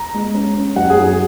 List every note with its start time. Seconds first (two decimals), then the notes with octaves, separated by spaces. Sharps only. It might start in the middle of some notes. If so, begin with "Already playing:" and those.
Already playing: A#5
0.14 G#3
0.35 C#4
0.55 C#4
0.76 F#2 F#5
0.90 G#4
0.97 F#3
1.03 G#4